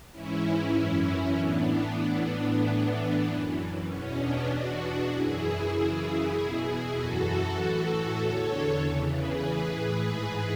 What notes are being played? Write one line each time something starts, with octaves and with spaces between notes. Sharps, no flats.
G#2 E3 C#4 E4
F#2 E3 C#4 E4
A2 E3 B3 D4
A2 E3
A2 E3
F#2 E3
E2 B2 C#4
B3 D4
E2 B2 D4 F#4
F#2 E3 E4 G#4
F#2 C#3 E3
E2 B2
F#2 E3 F#4 A4
A2 E3 F#4 A4
E2 D3 A4 C#5
E2 C#3 E3
G#4 B4
A2 E3 G#4 B4
G#2 E3 G#4 B4